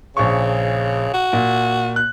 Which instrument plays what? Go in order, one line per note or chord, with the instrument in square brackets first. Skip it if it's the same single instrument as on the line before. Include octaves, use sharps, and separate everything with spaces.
[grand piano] A#1 C#6 [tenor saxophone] C#3
[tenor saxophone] F#4
[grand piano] A#2
F#6